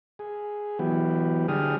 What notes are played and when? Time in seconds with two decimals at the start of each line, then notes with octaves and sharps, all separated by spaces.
0.19 G#4
0.79 E3 F#3 B3 G4
1.48 D3 G3 G4 G#4 D#6 F6